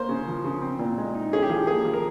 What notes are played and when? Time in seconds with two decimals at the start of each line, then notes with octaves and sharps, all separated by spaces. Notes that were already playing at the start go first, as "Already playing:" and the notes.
Already playing: A#3 C5
0.09 C#3
0.28 F3
0.44 C#3
0.62 C4
0.79 A#2
0.98 G#3
1.15 D#4
1.33 C#4 G#4
1.42 G4
1.49 F3 G#4
1.67 A#3 G#4
1.85 F3
1.93 A#4